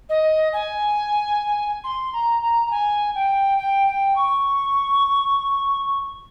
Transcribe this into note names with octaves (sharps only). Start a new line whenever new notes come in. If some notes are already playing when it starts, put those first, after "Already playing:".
D#5
G#5
C6
A#5
A#5
A#5
G#5
G5
G5
G5
C#6